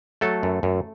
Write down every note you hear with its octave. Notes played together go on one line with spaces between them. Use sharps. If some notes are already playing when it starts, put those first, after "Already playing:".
F#3 A3 A4
F#2
F#2